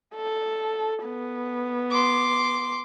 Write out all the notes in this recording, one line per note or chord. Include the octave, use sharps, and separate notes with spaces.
A4
B3
C6 D6